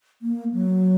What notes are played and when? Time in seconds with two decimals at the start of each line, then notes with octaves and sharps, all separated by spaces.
0.22 A#3
0.53 F#3